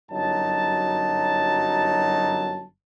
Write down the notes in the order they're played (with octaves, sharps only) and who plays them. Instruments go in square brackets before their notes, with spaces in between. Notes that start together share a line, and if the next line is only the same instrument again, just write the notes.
[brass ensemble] G1 F#2 F#3 D#4 A5